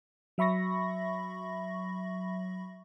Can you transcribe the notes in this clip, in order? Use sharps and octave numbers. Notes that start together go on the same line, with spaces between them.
F#3 E5 B5 C#6 A#6